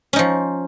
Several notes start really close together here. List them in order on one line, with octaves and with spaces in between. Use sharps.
C#4 D#4 F3